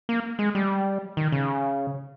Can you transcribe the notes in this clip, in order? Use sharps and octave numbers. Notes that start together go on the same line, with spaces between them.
A#3
G#3
G3
D#3
C#3